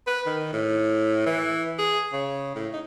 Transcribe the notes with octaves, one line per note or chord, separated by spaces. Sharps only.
B4
D#3
A2
E3
G#4
C#3
A2
D#4